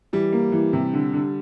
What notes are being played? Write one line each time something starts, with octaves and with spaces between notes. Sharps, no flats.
E3 G3
A#3
E3
C3
D3
D3